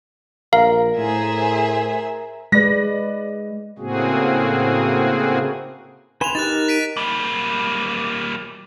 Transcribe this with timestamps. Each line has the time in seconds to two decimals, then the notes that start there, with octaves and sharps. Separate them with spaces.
0.53 A#1 A#4 F5
0.98 A2 G#4 C5 E5
2.52 G#3 B4 D5 A#6
3.78 A2 C#3 A#3 C4 F#4 G#4
6.21 B4 G#5 C6 E7 F7
6.35 D#4 G4 A#4 F#6 A6
6.68 B6 D7 D#7
6.97 G3 A#3